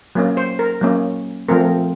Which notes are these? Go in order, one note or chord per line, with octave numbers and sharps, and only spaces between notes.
F#3 A#3 C#4
C5
A#4
F#3 A#3 C#4
F3 A3 C4 A#4